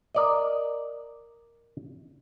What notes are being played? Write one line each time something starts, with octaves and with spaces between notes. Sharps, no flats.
A#4 D5 D#5